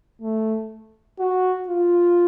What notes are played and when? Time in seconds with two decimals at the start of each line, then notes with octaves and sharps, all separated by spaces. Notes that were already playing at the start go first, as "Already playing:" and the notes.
0.22 A3
1.19 F#4
1.68 F4